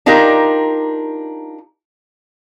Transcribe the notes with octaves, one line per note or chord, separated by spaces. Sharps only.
D4 D#4 F4 G4 A#4